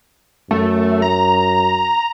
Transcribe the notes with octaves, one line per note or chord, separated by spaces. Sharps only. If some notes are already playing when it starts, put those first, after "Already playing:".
F#2 A3
A#5